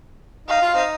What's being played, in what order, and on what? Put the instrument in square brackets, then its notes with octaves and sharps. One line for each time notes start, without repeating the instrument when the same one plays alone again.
[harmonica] D#4 [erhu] F5
[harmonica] F4
C4 D#4